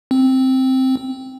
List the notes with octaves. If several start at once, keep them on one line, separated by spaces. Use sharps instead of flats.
C4